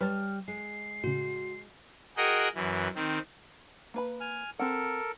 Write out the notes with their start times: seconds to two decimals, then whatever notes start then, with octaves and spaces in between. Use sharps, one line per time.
0.01 G3 B4 C#5 A5 F6
0.48 G#3 C7
1.04 A2 C#3 F#4
2.17 F#4 G#4 A#4 D#5 F#5 G5
2.55 F#2 E3
2.95 D#3 C4
3.94 A#3 B4 B5
4.20 G#5 F6
4.59 C4 A4 A#4 F#5